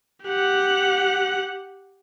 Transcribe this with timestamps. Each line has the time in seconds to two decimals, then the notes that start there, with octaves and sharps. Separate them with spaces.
0.25 G4 F#5